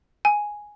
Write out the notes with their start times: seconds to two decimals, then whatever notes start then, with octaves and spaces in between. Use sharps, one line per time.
0.25 G#5